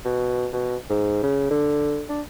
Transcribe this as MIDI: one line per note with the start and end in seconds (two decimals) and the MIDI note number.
0.05 0.47 47
0.53 0.76 47
0.90 1.21 44
1.23 1.49 49
1.51 2.04 50
2.09 2.21 62